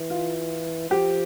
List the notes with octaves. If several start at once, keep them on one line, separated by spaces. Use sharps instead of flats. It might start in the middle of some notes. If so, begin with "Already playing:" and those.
Already playing: E3
F4
F3 G4